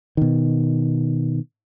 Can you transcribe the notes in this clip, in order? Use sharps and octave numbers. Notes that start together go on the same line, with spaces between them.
B2 D#3